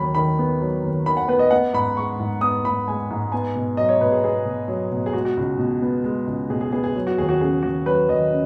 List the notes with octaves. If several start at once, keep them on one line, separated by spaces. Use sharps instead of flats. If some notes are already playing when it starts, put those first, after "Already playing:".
Already playing: D#2 F#3 B5
D#3 B5
B3
F#3
D#2
D#3 B5
F#5
B3 B4
D#5
B3 F#5
G#2 B5
G#3 C#6
G#2
B3 D#6
G#2 B5
G#3 G#5
G#2
B3 G#5
B2
F#3 D#5
C#5
B2 B4
G#4
B3 G#4
B2
F#3
B2
G#4
G#3 F#4
F#4
C#2
B2
B3
G#3
C#2
B2 G#4
G#4
B3 G#4
G#4
F#3
F#4
D#2 G#4
F#4
C#3 G#4
D#2 F#4
F#3 B4
D#2 D#5
C#3